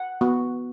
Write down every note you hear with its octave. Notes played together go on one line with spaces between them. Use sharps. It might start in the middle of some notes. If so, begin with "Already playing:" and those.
Already playing: F#5
B3 F#4